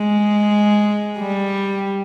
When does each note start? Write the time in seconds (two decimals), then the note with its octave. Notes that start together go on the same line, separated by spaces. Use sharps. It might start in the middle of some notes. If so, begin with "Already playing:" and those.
Already playing: G#3
1.19 G3